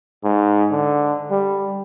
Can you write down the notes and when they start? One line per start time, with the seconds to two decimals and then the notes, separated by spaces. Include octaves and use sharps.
0.24 G#2
0.71 D3
1.31 G3